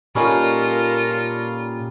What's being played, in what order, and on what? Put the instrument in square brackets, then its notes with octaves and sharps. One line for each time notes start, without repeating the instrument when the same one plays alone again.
[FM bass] A#2 [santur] G3 C#4 D#4 [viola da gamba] F4 [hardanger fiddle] A4 A#4